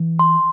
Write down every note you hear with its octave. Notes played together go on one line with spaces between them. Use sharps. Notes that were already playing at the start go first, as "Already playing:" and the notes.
Already playing: E3
C6